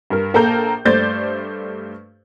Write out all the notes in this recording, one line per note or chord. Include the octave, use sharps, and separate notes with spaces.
G2 A#4
A#1 A#3 A4 A#4 A#5 G6
G2 A3 C5 D5 G6 A6